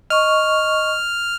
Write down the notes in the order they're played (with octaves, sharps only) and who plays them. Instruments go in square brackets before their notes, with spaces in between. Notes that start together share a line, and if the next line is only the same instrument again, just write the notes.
[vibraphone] D#5 C#6 [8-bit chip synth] F6